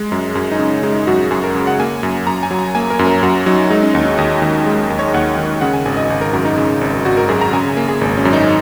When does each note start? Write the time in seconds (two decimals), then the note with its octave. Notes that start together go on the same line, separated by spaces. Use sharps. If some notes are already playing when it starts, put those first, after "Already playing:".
Already playing: G#3
0.12 F#2
0.35 F#2 C#4
0.52 D#4
0.59 C#3
0.83 G#3 D#4
1.07 F#2 F#4
1.31 F#2 G#4
1.44 A#4
1.55 C#3
1.67 F#5
1.80 A#3 G#5
2.03 F#2
2.27 F#2 A#5
2.43 G#5
2.51 F#3
2.59 A#5
2.75 A#3 G#5
2.90 A#4
2.99 F#2
3.07 A#4
3.23 F#2 F#4
3.46 F#3 D#4
3.70 G#3 D#4
3.83 C#4
3.94 D#2 D#4
4.06 D#4
4.18 D#2 D#5
4.42 D#3
4.66 G#3
4.90 D#2
4.99 C#5
5.06 D#5
5.14 D#2 F#5
5.38 D#3
5.61 C#3 F#5
5.73 G#5
5.86 G#1 G#5
5.97 D#5
6.10 G#1
6.21 A#4
6.33 F#2 F#4
6.45 D#4
6.57 C#3
6.81 G#1
7.05 G#1 F#4
7.17 A#4
7.29 F#2 G#4
7.41 A#5
7.53 C#3 G#5
7.77 A#3
7.89 G#4
8.01 G#1
8.17 C#4
8.25 F#2
8.33 D#4